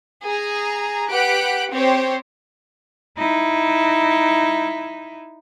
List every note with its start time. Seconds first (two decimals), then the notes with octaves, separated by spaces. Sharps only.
0.25 G#4 A#5
1.10 G4 B4 F#5 F#6 B6 D7
1.73 C4 G4 C5 C#5
3.18 D#4 E4